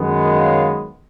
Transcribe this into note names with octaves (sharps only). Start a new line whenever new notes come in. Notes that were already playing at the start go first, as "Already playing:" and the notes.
Already playing: F#2 D#3 G#3 B3
C#5 F5